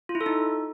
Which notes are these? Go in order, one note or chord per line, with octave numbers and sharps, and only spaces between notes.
F4
E4
A4
D#4